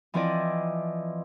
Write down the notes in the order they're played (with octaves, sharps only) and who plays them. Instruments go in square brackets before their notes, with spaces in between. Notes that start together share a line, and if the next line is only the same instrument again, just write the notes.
[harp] E3 F3 C4 E4 D5 D#5